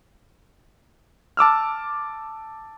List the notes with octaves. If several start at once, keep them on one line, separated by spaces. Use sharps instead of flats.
A5 D6 E6 F6